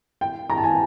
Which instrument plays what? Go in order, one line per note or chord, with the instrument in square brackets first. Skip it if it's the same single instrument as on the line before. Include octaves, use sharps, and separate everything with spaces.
[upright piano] G5
A#5
A5
G#5